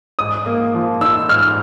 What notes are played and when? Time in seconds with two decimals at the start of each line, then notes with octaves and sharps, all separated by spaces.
0.19 G#2 D#6
0.46 A#3
0.74 F3
1.01 D#4 E6
1.29 G#2 F6